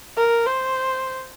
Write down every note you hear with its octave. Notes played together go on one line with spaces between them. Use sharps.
A#4
C5